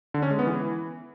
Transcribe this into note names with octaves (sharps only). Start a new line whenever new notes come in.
D3
C#4
G#3
B3
E3